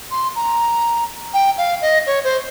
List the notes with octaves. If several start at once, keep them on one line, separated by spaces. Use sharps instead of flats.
C6
A#5
G5
F5
D#5
C#5
C5